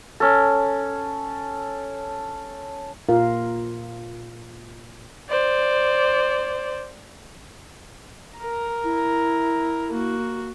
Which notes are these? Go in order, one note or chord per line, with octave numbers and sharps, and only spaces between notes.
C#4 A4
A#2 F4 A#4 F5
C5 D5
A#4 A#5
E4
A#3 F#4